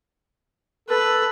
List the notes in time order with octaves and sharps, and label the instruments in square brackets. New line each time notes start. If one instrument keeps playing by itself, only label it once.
[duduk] A4 [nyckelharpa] B4